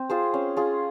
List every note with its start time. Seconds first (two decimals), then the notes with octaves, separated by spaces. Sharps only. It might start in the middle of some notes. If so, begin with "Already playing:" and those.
Already playing: C4
0.10 F4 G#4 C5
0.34 C#4
0.57 F4 G#4